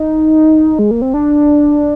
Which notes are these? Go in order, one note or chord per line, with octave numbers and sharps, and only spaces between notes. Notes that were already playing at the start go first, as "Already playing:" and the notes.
Already playing: D#4
G#3
A#3
C4
D4